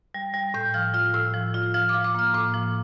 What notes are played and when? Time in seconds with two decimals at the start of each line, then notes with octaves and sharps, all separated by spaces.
0.14 G3
0.34 G3
0.54 A2 G6
0.74 F3 F6
0.94 F4 F6
1.14 A2 E6
1.34 F3
1.54 F4
1.74 F3 F6
1.89 D6
1.94 F3
2.04 D6
2.15 A#3 F6
2.34 A2 D6
2.54 F3